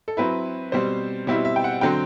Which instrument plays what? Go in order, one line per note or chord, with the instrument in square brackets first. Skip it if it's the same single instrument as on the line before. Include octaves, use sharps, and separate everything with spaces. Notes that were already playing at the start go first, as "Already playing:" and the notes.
[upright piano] A4
F#3 C4 E4 B4
B2 G3 C4 C5
B2 G3 C4 E4
E5
G5
F#5
D3 F#3 C4 G5